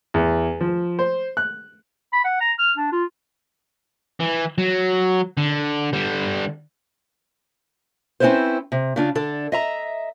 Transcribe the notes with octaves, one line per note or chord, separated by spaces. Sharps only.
E2
F3
C5
F#6
B5
F#5
A#5
F6
D4
F4
E3
F#3
D3
D3 G3
C4 C#4 E4 F4 B4 C5
C3
C#3 D4 F4
D3 D4 A4
D#5 E5 A#5